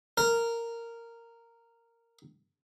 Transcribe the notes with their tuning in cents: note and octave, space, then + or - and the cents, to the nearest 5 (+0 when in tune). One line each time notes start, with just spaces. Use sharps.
A#4 -10